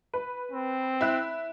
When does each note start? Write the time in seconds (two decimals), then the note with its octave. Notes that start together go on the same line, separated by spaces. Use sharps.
0.14 B4
0.52 C4
1.01 E4 F#6